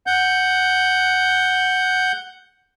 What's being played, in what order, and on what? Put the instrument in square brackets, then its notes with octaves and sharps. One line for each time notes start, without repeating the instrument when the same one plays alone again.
[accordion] F#5 G6